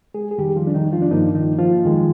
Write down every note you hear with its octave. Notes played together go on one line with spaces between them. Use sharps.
G#3 G#4
G#4
F2 D#3 G3 G4
F3 F4
D4
D#3 D#4
F3 F4
D4
G2 D#3 F3 A#3 D#4
D#3 D#4
F3 F4
F2 D#3 G#3